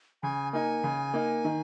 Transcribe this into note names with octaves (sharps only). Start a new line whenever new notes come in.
C#3 G#5
A#3 D#4 G#5
C#3
A#3 D#4
D#3